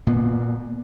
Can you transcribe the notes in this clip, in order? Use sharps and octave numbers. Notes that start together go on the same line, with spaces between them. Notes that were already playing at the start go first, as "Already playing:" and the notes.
A#2 B3